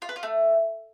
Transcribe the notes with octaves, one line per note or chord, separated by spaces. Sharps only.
F4
B4
F4
A3